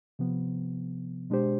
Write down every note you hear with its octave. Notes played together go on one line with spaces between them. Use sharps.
C3 F3 B3
B2 G#3 D4 G4 C5